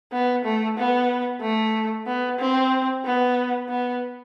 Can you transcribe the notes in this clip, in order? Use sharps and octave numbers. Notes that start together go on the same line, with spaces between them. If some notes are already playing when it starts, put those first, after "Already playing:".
B3
A3
B3
A3
B3
C4
B3
B3